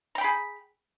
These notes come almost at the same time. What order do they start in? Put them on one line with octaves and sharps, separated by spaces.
A#5 G5 B5 G#4